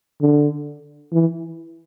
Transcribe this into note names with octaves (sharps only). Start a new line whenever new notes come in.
D3
E3